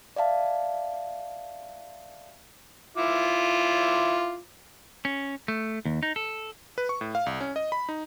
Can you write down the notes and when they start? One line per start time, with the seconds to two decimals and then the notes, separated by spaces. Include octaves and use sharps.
0.16 D5 E5 F5 A5
2.97 E4 F4 D6
5.05 C#4
5.48 A3
5.85 D#2
6.03 D#4
6.16 A4
6.78 B4
6.89 C#6
7.01 A2
7.15 F5
7.26 C2
7.41 C#4
7.56 D#5
7.72 B5
7.89 D#4